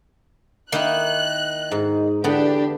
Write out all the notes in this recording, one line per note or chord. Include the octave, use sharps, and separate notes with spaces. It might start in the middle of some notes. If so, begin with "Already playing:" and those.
D#3 A#3 D#4 E4 F#6
G#2 D#4
E2 D3 B3 D4 E4 G4 B4